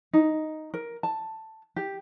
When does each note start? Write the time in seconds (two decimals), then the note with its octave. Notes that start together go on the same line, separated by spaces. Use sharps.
0.13 D#4
0.74 A#4
1.03 A5
1.76 G4